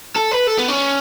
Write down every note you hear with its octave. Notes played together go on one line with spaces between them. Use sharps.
A4
B4
A4
B3
C#4